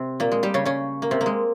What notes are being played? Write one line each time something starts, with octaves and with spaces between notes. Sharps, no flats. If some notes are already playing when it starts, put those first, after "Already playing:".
Already playing: C3 C4
A#2 A#3
G#3
G3 G4
C#3 C#4
C#3 C#4
A#3
C3 C4
A#3
G#3